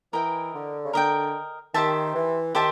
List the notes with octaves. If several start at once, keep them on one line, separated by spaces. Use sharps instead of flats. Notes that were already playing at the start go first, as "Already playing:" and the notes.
E3 A#4 D#5 G5
D3
C#3
D3 A#4 D#5 G5
D#3 G4 C5 E5 A5
E3
D#3 G4 C5 E5 A5